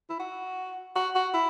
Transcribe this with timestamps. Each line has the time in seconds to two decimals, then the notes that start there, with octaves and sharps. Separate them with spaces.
0.10 E4
0.20 F#4
0.96 F#4
1.15 F#4
1.34 E4